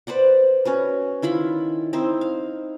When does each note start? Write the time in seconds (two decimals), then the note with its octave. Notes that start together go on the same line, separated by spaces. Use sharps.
0.07 B4 C5 D5 F#5
0.65 C#4 F#4 B4
1.22 D#3 E4 F4 B5
1.93 C4 D#4 E4 C5
2.21 F5